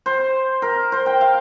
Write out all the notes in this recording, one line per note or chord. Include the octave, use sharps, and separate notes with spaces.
C5
A#4
C5
G5
F5